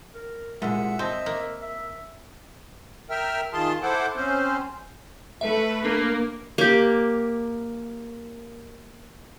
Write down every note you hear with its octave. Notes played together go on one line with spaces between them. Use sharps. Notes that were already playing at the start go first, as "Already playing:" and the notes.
A#4
C2 A#2 G#3 E5 F#5
C4 D#5 A5
A#3
E5
A#4 E5 G5 F6
D#3 F4 G#4 A5 C6
E4 A4 C5 F#5 D6
C4 C#4 C5
A3 B4 E5
A#3 D4
A#3 G4